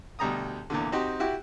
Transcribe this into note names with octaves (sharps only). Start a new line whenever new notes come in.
D2 B2 G3 A#5 D#6
E2 A#2 D3
C4 D#4 F#4 G4
E4 F#4 G4